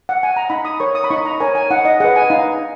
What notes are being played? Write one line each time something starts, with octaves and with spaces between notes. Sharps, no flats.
F#5
G#5
A#5
D#4 B5
D#6
A#4 C#5 C#6
D#6
B5
D#4 C#6
A#5
A#4 C#5 G#5
G#5
D#4 F#5
D#5
G#4 B4 F#5
G#5
D#4 F5